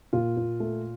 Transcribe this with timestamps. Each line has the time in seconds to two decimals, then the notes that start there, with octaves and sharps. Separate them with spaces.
0.13 A#2 F4
0.37 A#2
0.60 A3